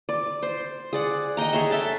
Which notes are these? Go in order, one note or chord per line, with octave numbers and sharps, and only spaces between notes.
D5
C5
G#4 D5 F#5
D#5 F#5 G5 A#5
G#4 C#5 E5
A4 E5 G5 A5